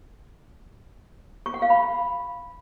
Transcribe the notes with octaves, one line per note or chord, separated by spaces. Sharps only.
C#6
F#5
F5
B5